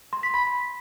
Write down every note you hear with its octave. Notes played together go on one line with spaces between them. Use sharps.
C6
B6
B5